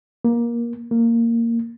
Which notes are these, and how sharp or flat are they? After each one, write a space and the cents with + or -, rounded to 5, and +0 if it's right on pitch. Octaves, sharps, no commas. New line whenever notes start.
A#3 +20
A#3 -10